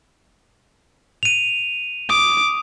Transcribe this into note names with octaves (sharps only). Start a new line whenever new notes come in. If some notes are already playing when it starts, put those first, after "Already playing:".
D#7 F7
D6 D#6